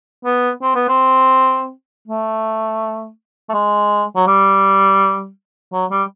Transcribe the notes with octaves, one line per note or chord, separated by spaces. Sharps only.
B3
C4
B3
C4
A3
A3
G#3
F#3
G3
F#3
G3